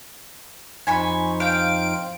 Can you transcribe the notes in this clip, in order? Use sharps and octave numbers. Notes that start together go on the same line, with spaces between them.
F2 D#4 C5 G#5 B5 C#6
F5 G5 D7